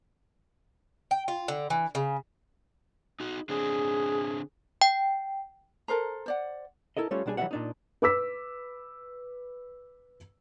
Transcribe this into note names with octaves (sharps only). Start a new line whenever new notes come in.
G5
F4
D3
E3
C#3
D#4 F#4
D3 C4 D4 G#4
G5
A4 A#4 C5 A#5
C5 D5 F#5
E4 A4 A#4 D#5
G3 A3 C#4 F4 C#5
B1 G3 D4 G#4 G#5
E3 F#3 G3 D4 E5 F#5
A#2 D4 D#4
B4 D6 E6 B6